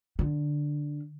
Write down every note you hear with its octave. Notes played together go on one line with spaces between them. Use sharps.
D3